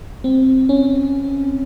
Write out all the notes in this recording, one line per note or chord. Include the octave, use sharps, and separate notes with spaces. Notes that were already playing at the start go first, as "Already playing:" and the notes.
C4
C#4